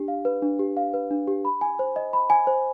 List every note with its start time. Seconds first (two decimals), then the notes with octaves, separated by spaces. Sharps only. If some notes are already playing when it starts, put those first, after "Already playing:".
Already playing: D4 G4
0.08 F5
0.25 B4
0.42 D4
0.59 G4
0.77 F5
0.94 B4
1.11 D4
1.28 G4
1.45 B5
1.61 G#5
1.79 C5
1.96 D#5
2.13 B5
2.30 G#5
2.47 C5